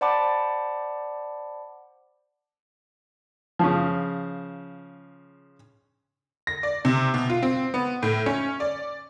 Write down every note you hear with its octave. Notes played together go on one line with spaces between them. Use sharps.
C5 D5 F#5 A5 B5 D6
C#3 F3
A#6
D5
C3
B2
F4
C4
B3
A2
C#4
D5